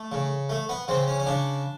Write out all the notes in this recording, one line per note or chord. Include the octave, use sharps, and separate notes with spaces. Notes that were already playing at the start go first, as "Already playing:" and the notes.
Already playing: A3
C#3
A3
B3
C#3 C4
C#4
C#4
C#3 D4